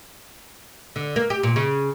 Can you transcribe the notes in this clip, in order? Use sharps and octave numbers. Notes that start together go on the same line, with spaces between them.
D3
A#3
G4
A#2
C#3